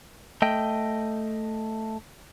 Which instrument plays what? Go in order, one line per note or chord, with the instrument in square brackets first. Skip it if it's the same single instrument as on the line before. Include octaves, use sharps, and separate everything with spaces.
[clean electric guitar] A3 D#5 G5